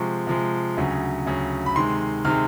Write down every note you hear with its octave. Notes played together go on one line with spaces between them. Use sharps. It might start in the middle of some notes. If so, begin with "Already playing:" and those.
Already playing: C3 F3 G#3 C#6
C3 F3 G#3
D2 C#3 F#3
D2 C#3 F#3
B5
C3 D#3 G#3 C6
C3 D#3 G#3 F6